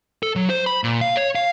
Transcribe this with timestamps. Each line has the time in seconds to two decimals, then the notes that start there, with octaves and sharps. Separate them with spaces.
0.23 A4
0.36 F#3
0.50 C5
0.66 B5
0.84 A#2
1.01 F5
1.17 C#5
1.35 F5